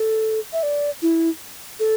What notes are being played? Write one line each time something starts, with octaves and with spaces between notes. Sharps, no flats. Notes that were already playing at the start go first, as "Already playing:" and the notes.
Already playing: A4
E5
D5
E4
A4